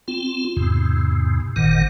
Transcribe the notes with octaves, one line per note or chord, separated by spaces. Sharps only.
C4 F4
E2 G#2 C3
G#1 A#2 D#3 F#5